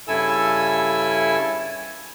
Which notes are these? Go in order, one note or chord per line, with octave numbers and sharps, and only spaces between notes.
G2 C#3 E4 A4 G#5 E6